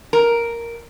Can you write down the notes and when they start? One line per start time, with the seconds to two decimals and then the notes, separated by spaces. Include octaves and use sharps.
0.13 A#4